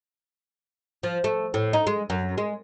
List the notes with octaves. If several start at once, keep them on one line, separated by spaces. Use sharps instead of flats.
F3
A3
A2
D#4
G#3
F#2
G#3